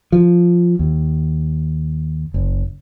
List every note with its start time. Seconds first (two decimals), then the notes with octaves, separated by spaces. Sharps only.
0.12 F3
0.79 D#2
2.34 F#1